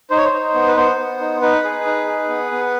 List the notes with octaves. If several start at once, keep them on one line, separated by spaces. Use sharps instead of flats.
D#4 C5
C#5
C5
D#4
B3
B4
B3 C5
B3
D#4
D#4 B4
G#4
D#4
G#4
B3
B3